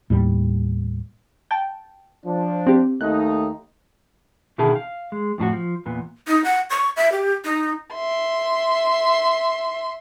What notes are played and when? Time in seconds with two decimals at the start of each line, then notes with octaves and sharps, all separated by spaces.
0.10 D#2 A2 G3
1.51 G5 A5
2.26 F3 D4
2.66 C4 G4
3.01 D#2 A3 D#4 F#6
4.58 B2 D3 D#3 E4 G#4 A5
4.75 F5
5.12 G#3
5.38 F2 A2 D4 F#4
5.53 F3
5.86 E2 A#2 B3
6.28 D#4
6.44 F#5
6.70 C#6
6.97 E5
7.12 G4
7.45 D#4
7.94 E5 C6